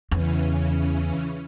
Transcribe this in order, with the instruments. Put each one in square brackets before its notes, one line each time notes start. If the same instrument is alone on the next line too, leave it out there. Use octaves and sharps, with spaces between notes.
[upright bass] E2 [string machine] C#3 E3 C#4